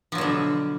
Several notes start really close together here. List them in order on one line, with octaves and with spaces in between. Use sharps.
F3 F#3 B2 D3